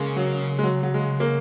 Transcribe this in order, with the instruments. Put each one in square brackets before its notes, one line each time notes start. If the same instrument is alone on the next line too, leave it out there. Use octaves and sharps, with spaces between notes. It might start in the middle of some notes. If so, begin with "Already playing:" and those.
Already playing: [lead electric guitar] C#3 [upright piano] G#3 A#3
[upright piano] F#3
G#3
F#3
F#3
G#3
A#3